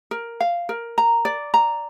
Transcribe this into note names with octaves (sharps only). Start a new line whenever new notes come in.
A#4
F5
A#4
A#5
D5
A#5